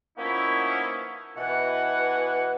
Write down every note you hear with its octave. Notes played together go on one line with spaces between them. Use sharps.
F3 A#3 B3 C#4 D#4 E4
B2 E3 F#5